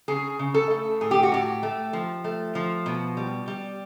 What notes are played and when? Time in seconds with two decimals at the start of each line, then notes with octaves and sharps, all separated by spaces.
0.08 C#3 G#4
0.39 C#3
0.54 A4
0.70 A3
1.01 A2 G#4
1.11 G4
1.23 F#4
1.32 A2 G4
1.63 A3
1.93 F3
2.24 A3
2.55 F3
2.86 B2
3.17 G3
3.48 G3